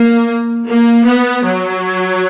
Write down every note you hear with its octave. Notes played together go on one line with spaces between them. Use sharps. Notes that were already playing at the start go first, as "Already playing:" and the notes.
Already playing: A#3
A#3
B3
F#3